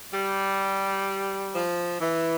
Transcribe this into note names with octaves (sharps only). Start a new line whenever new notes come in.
G3
F3
E3